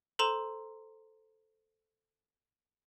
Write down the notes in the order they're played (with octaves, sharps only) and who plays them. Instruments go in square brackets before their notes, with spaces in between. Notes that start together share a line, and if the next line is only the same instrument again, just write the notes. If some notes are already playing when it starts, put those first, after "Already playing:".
[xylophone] A4 C5 A#5 C6 E7